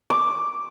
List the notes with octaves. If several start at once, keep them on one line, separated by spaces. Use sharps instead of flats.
D6